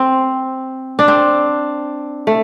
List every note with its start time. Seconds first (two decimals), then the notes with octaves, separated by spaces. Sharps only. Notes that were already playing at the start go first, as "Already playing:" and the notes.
Already playing: C4
0.99 D4
1.08 C4
2.27 A3